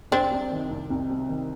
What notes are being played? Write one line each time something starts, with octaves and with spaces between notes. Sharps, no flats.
C2 C4 D4
C3
D#3
C2
C2
C3
D#3